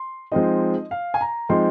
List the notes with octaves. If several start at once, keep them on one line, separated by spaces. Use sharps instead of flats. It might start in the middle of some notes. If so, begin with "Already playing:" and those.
Already playing: C6
F3 G#3 C4 D#4 D#5
F5
G#5
A#5
F3 G#3 C4 D#4 C6